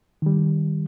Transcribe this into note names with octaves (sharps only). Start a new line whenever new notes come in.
D#3 G3